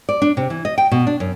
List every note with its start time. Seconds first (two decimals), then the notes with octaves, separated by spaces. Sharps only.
0.09 D5
0.22 D4
0.37 C3
0.50 E3
0.65 D#5
0.78 G5
0.92 B2
1.07 D4
1.20 F#2